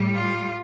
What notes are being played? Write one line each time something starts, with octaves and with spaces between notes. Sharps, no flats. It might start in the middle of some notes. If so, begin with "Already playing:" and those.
Already playing: A2 G3
F4